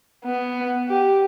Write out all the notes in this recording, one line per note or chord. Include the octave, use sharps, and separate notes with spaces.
B3
G4